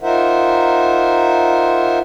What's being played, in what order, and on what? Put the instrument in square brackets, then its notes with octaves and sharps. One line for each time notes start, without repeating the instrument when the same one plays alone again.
[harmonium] D#4 F4 A#4 C5 E5 F#5